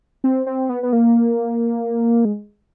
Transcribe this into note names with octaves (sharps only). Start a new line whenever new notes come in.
C4
C4
B3
B3
A#3
G#3